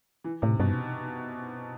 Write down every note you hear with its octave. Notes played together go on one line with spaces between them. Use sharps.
E3
A2 C3
G2 B2